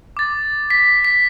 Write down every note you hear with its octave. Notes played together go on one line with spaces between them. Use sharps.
D6 A6
B6
B6